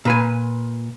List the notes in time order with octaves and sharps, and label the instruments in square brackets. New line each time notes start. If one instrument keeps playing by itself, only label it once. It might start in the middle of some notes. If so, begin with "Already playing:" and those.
[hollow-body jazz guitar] A#2 B4 G#5